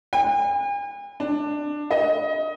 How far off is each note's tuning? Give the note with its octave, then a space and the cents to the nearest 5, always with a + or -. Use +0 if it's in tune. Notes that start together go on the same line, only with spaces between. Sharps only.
G#5 -45
D4 +15
D#5 +20